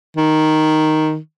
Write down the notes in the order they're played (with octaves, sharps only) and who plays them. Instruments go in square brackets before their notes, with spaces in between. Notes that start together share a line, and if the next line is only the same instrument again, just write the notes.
[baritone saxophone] D#3